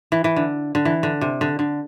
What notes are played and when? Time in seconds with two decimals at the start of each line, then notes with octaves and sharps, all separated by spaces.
0.12 E3
0.24 E3
0.36 D3
0.75 D3
0.85 E3
1.03 D3
1.21 C3
1.41 D3
1.59 D3